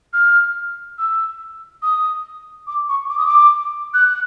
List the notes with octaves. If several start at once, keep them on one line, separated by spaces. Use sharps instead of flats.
F6
E6
D#6
D6
C#6
D6
D#6
D6
F#6